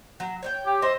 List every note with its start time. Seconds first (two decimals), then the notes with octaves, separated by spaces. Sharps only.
0.20 F#3
0.43 C#5 D5 G5
0.66 G4
0.82 C5 D#5 E5